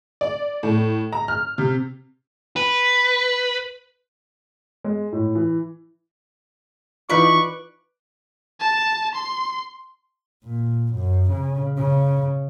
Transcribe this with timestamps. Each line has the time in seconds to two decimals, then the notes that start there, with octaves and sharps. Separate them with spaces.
0.21 D5
0.63 A2
1.13 A#5
1.28 F6
1.58 C3
2.56 B4
4.84 G#3
5.12 A2
5.35 E3
7.10 E3 D#4 F4 B4 D5 C#6
8.60 A5
9.15 C6
10.45 A#2
10.94 F#2
11.32 C#3
11.77 C#3